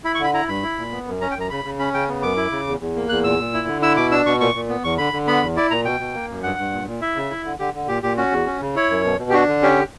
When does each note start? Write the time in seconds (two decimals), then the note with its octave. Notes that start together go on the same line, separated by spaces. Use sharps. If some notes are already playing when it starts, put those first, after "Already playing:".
0.04 E4 B5
0.15 C#6
0.20 D3 B5
0.34 E4 A#5
0.48 G2 B5
0.63 E4
0.78 A#2
0.92 B3
1.07 F#2
1.21 C#4 A#5
1.31 G5
1.36 F#2 A#5
1.50 C#3 B5
1.64 C#3
1.79 C#4 B5
1.94 C#3 G5
2.08 B3
2.22 F#2 D6
2.37 E4
2.52 C#3
2.67 E2
2.80 E2
2.96 A#3
3.09 E2 F#6
3.24 A#2 E6
3.39 A#2
3.54 E4
3.68 D3
3.82 E4 E6
3.97 B2 D6
4.11 D4 E6
4.26 B2 C#6
4.40 A#2 C#6
4.55 A#2
4.69 B3
4.84 E2 C#6
4.98 D3 B5
5.13 D3
5.27 B3 B5
5.42 E2
5.57 E4 D5
5.71 A#2 A#5
5.85 B2 G5
6.00 B2
6.14 A#3
6.29 F#2
6.43 G2 F#5
6.58 G2
6.72 A#2
6.87 A#2
7.01 E4 E5
7.16 C#3
7.30 E4
7.45 D3
7.59 D3 G4
7.74 D3
7.88 A#2 G4
8.03 A#2 G4
8.17 C#4 F#4
8.31 E2
8.46 C#4
8.61 C#3
8.76 E4 C#5
8.90 F#2
9.04 B2
9.19 B2
9.30 G4
9.33 D4 F#4
9.48 D3
9.63 C#4 G4